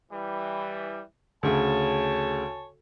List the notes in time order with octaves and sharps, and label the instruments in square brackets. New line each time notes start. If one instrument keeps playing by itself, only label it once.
[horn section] E3 G3
[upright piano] D2 C#3 [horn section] C#5 G#5 A5